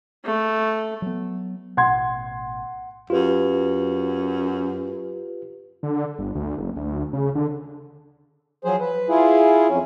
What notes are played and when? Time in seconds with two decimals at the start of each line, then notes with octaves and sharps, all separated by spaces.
0.25 A3
1.02 F#3 B3
1.77 A1 B2 F#5 C6 G#6
3.10 F#2 F4 G4 B4
5.83 D3
6.19 G1
6.35 D2
6.58 F#1
6.76 D2
7.13 C#3
7.35 D3
8.65 F3 F#3 G#4 C5
8.80 B4
9.09 E4 F4 G#4
9.68 F2 C#4